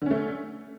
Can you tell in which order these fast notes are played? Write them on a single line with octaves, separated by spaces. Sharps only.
D3 C#4 A3